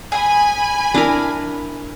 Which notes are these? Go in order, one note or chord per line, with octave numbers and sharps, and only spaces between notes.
G#4 G#5 B5
D4 E4 A#4